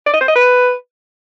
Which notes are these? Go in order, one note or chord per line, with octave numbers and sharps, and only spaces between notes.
D5
D#5
C5
D#5
B4